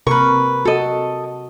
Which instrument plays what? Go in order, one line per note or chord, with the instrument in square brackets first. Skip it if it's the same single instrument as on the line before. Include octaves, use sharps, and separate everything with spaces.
[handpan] C3 A#4 [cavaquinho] B4 C#6
[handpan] F#4 [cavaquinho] A4 D#5